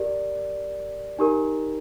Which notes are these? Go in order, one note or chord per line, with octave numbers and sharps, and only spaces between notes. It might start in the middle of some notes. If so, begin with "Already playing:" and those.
Already playing: G4 A#4 D5
D#4 G4 A#4